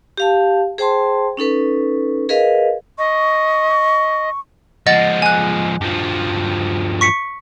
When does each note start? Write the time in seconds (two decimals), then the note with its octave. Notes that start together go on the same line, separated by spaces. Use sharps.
0.17 G4 F5 A5
0.78 G#4 C5 G5 A5 C6
1.37 C#4 D#4 A4 B4
2.29 G#4 A#4 B4 D#5 F5
2.98 D#5 C#6
4.87 F3 G#3 D#5 F#5 A6
5.22 G#5 F#6
5.81 G2 F3
7.01 C#6 B6 C#7